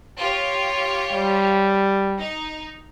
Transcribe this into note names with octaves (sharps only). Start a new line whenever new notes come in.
F4 G4 C#5
G3
D#4